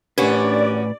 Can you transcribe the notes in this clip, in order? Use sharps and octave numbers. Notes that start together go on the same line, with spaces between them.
A2 C#4 D4 F#4 G4 A#4 B4 D5